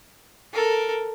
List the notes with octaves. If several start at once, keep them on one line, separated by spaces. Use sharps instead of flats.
A4 A#4